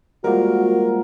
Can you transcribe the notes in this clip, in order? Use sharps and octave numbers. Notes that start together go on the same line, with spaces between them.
G3 G#3 A#3 F4 F#4 A#4 C5 F#5